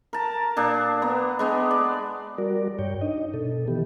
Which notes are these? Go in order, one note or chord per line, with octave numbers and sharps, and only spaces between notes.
A#4 A5
A#2 D4 A5
B3 A#5
G#3 B3 D4
D5
G3 F#4 A#4 D5
G2 C#5 G5
D4 D#4 D#5
B2 A4
D#3 E3 B3 G4